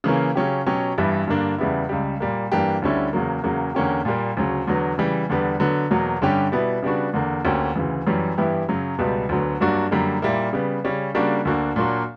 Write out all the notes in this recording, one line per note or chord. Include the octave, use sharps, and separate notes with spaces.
C#3 E3 A#3 C#4
C#3 F#3 C#4 G4
B2 F#3 C#4 G4
G2 E3 G3 B3 E4
G2 D3 A#3 D4
E2 C#3 G3 B3 E4
C#2 C#3 G3
A#2 G3 A#3
G2 E3 A#3 D4 G4
D2 D3 G3 C#4 E4
E2 C#3 F#3 A#3
E2 C#3 F#3 A#3
E2 D3 A#3 C#4 G4
A#2 G3 A#3
D2 C#3 F#3
E2 D3 F#3 B3
C#3 E3 G3
E2 D3 G3 B3
D3 F#3 B3
E2 B2 F#3 A#3
G2 D3 G3 C#4 G4
B2 G3 B3 E4
C#3 G3 B3 D4 F#4
E2 D3 A#3
D2 D3 A#3 C#4 G4
D2 C#3 E3
F#2 E3 G3 C#4
G2 E3 B3 E4 G4
F#2 C#3 F#3
C#2 B2 G3 B3
D2 D3 F#3 B3
G2 F#3 A#3 D4 F#4
F#2 D3 G3 A#3
A#2 G3 A#3 E4
C#3 G3 B3
C#3 G3 C#4
C#3 G3 A#3 D4 F#4
D2 D3 A#3 D4 F#4
A#2 F#3 A#3 D4 F#4